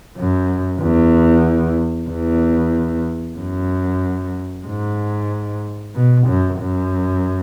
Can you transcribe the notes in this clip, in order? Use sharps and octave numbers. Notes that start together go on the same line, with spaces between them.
F#2
E2
E2
F#2
G#2
B2
F#2
F#2